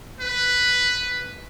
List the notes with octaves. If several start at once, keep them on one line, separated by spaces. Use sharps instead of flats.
B4